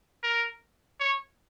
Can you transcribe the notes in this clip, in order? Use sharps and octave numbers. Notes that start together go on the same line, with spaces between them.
A#4
C#5